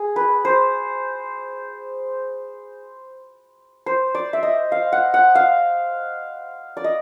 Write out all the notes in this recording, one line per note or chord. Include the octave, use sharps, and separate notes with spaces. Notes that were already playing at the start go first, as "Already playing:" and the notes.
Already playing: G#4
B4
C5
C5
D5
E5
D#5
F5
F#5
F#5
F5
D5
D#5